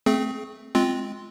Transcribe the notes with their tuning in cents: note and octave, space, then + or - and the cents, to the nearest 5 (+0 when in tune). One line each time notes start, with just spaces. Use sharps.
A3 +0 C4 +0 G#4 +35
G#3 +15 C4 +0 F4 -5